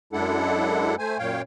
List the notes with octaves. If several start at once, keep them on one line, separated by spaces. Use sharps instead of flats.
F#2 G#3 D4 E4 A4 F#5
A3 C5 G#5
F#2 A#2 C#5 F5 G5